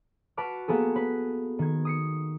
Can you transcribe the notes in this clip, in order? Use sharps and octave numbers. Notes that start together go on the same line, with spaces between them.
F#4 B4 A5 D6 F6
A#3 B3 G#4 A4
B4
D#3 G#6
D#6 C7 C#7